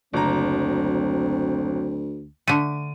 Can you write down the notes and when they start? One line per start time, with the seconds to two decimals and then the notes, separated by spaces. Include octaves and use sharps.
0.13 F#1 D2 F#3 C4 A#5
2.47 D3 A3 D#7